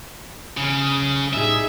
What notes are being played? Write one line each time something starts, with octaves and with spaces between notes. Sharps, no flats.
G1 C#3
B1
A2 G3 D#4 G#4 E5